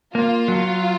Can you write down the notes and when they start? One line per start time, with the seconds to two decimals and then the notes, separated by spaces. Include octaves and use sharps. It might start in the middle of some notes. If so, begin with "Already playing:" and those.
0.15 A#3 F4
0.48 F#3